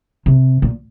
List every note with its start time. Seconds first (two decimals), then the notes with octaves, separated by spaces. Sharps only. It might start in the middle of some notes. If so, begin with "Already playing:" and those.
0.26 C3
0.62 A#2